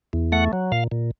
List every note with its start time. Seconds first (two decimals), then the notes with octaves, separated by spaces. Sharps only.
0.13 E2
0.32 A3 F#5
0.53 F#3
0.72 A#2 F5
0.91 A#2